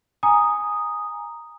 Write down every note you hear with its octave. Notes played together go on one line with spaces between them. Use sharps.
G#5 A#5 D#6